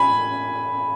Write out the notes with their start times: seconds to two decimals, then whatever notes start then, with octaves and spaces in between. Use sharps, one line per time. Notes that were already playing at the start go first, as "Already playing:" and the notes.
Already playing: G#5 B5